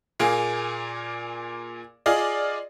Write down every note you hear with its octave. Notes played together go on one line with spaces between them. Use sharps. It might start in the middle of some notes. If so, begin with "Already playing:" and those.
A#2 A#3 G#4
F4 G#4 D5 D#5